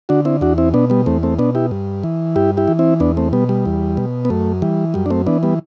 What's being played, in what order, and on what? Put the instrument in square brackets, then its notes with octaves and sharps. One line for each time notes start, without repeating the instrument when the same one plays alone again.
[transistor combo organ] D3 D4 F#4
C4 E4
E2 D4 F#4
C4 E4
B2 B3 D4
G3 B3
E2 A3 C4
A3 C4
B2 B3 D4
E4 G4
G2
E3
G2 E4 G4
E4 G4
E3
C4 E4
E2 B3 D4
A3 C4
B2 G3 B3
G3
E2
B2
B3
F#2 A3
E3 G3
F#2 G3
D4
A3 C4
E3 B3 D4
G3 B3